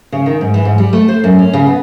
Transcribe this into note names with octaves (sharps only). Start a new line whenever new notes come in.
C#3
D#3
G#2
E3
G#2
G3
A3
C5
F#2
C#4
C#3
B3